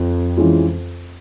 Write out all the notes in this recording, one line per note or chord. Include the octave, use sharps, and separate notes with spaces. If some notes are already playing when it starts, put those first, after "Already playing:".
Already playing: F2
E3 G#3 C#4 F4